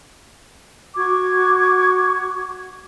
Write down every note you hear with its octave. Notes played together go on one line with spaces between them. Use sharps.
F#4 C#6 D6 G#6